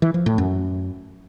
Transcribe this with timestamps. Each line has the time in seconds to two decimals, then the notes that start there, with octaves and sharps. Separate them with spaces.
0.02 E3
0.14 F3
0.26 A2
0.38 F#2